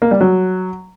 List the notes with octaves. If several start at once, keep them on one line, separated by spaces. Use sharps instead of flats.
A#3
G3
F#3